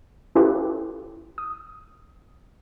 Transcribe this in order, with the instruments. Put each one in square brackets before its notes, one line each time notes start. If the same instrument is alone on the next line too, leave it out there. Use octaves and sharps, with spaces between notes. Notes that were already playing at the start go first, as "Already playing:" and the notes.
[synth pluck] C#4 E4 F4 G4 A4 B4
D#6